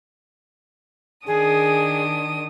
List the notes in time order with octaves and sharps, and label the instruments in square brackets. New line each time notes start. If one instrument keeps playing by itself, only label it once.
[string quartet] D#3 D4 D#6 [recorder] G#4